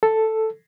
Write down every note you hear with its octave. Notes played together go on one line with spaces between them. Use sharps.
A4